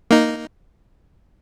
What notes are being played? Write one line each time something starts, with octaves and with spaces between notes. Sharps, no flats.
A#3 D#4